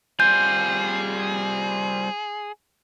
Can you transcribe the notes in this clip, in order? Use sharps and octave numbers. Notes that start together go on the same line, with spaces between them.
G3 C4 F4 G#4 G6